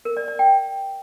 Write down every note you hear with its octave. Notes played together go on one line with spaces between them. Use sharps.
A#4
D5
D5
G5